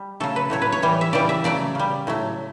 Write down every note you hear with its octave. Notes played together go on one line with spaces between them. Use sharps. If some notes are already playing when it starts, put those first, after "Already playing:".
Already playing: G3
C#3 F#3 A3 A4
B4
A2 F#3 A3 C#5
B4
C#5
A2 E3 G3
E5
C#3 E3 G3 D5
E5
C#3 F#3 A3 D5
C#3 G3
A2 F#3 A3